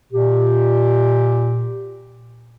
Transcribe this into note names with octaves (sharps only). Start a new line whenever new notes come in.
A#2 G4